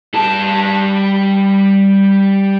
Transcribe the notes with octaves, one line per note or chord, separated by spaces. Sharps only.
G3 A5